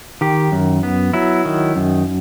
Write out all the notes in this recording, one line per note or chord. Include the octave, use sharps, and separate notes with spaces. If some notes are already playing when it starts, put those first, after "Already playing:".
D#3 G4
F#2
B3
F#3 E4
D#3
F#2